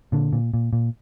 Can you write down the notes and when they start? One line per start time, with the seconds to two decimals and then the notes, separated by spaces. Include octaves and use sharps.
0.12 A#2 D3
0.33 A#2
0.54 A#2
0.73 A#2